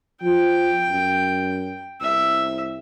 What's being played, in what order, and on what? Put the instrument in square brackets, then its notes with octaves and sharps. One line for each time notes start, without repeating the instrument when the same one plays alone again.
[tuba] F3 [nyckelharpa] G5
[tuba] F#2
[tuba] C2 [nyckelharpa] E5